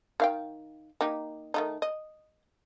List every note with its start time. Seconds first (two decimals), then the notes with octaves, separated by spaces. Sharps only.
0.20 D#3 F5 G5
1.01 A#3 D#4 G4
1.54 D#3 A3 D#4
1.82 D#5